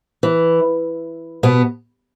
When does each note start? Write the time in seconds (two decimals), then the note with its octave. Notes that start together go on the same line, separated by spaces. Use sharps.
0.23 E3
1.43 B2 B3